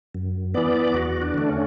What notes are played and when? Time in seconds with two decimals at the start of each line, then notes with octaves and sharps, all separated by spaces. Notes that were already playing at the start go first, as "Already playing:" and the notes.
0.15 F#2
0.54 E3 B3 D5
0.94 E2 F#4
1.22 D4
1.34 D3 A3
1.48 C#4